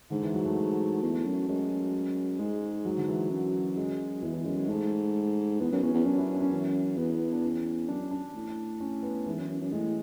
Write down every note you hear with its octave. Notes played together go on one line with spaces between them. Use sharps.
G#2 D3
E3
F#3
A3
E2
F#2
F#2 G#3
G#2 G#3
F#3
D3
E3
F#2
G#3
E2 E3
E3
F#2 G#3
G#3
G#2 A3
E2 B3
F#2
E2 C#4
E2
F#2 D4
E4
D4
C#4
E3
E2 B3
D4
C#4
F#2 D4
D4
A2
C#4
B3
G#2 E3
F#2
F#2
F#2
A2 G#3